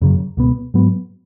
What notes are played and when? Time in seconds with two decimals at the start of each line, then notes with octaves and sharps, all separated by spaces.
0.02 F#2 C#3 F#3
0.37 C#2 B2 B3
0.74 G#2 F#3 B3